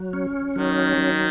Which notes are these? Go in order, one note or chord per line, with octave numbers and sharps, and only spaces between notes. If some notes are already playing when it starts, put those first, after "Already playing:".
Already playing: F#3
C#4
D#3 F#3
F#3